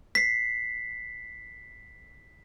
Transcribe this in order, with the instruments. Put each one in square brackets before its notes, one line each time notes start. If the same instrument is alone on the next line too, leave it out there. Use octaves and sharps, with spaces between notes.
[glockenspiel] B6 C7